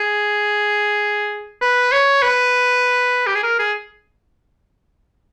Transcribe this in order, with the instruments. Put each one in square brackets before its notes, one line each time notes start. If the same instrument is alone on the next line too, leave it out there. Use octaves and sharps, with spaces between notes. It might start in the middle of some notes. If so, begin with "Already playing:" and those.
Already playing: [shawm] G#4
B4
C#5
B4
G4
G#4
A#4
G#4